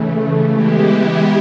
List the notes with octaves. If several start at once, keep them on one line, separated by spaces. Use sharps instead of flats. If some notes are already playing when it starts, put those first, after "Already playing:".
Already playing: C#3 E3 A3
E3 G#3 B3 E4 G4